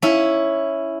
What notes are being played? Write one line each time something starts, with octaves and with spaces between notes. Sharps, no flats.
C#4 E4